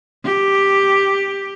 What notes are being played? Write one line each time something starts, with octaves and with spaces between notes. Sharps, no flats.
G4